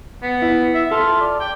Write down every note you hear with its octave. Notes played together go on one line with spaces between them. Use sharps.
B3
E4
E5
F4 A4
D5
G5